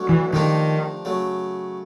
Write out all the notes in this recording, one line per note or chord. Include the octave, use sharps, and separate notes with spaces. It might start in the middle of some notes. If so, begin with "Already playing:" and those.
Already playing: D3 F#3 A3 C#4 F#4
E3
D#3 F3 A3 D4 G4 A#4
C#3 F#3 A3